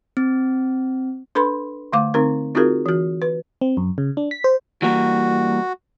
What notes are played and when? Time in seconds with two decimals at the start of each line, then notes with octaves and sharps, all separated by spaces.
0.17 C4
1.35 D4 A4 B4 B5 C6
1.93 D3 A3 F5 D6
2.14 D3 C4 D#4 A#4
2.55 C4 D#4 F4 F#4 G#4 A#4
2.86 E3 F#4
3.22 B4
3.61 C4
3.77 F#2
3.98 C#3
4.17 D4
4.31 B6
4.44 C5
4.82 E3 G3 A#3 F#4